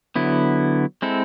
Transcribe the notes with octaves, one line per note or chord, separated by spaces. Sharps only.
D3 F#3 B3 E4
G#3 C4 E4 A4